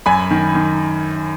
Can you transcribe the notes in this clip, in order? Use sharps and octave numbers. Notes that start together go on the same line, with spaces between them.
F#2 G#5 B5
D#3
D#3